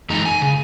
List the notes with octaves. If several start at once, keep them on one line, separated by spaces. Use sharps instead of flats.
F#2 E3 G#3 D#4 A#5
G#5
C#3